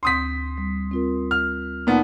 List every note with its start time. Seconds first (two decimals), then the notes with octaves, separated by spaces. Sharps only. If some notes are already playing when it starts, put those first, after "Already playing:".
0.03 D2 C4 C6 D#6 G6 B6
0.58 G3
0.91 C4 F4 A#4
1.31 F6
1.87 A#2 B3 D#4 F#5 A5